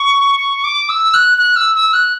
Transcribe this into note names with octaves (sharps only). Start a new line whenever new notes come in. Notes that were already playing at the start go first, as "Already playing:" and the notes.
Already playing: C#6
D6
E6
F#6
F#6
E6
E6
F#6